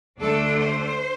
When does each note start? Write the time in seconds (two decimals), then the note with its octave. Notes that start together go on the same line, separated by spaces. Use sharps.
0.20 D2 D3 A3 D4 A4
0.58 C5